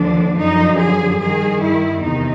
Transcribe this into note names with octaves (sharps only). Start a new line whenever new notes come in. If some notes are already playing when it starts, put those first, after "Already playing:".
Already playing: D#2 D3 F3 D4
F#2 D3 F3 D#4
G#4
G2 D#3 G#4
E4
E2 C3 D#3 D#4